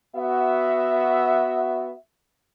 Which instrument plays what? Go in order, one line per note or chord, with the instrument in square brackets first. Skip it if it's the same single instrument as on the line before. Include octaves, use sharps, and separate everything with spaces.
[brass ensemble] B3 F#4 E5